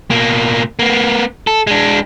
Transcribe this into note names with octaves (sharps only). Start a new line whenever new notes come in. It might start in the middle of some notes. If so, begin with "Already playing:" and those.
B2 A#3
A#3 B3
A4
G#3 D4